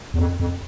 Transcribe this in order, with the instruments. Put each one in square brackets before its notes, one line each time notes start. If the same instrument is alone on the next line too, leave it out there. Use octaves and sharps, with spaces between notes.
[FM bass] E2
F2
F2